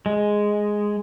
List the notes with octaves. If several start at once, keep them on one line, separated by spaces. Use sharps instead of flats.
G#3